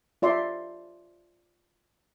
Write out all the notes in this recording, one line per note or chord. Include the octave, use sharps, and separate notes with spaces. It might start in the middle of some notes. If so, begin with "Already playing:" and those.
F4 D5 E5 C6